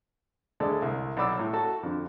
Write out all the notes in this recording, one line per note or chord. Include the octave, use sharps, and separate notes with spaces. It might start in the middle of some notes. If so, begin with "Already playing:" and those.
D2 G#3 A4 D5
C2
B1 C#5 D5 B5 D6 E6
A2
F#4 A4 A5
F2 D3